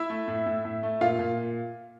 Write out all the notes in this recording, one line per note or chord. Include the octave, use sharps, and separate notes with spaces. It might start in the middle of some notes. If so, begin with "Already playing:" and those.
Already playing: E4 E5
A3
A2
A2
A2
A3
A#2 F4 F5
A#2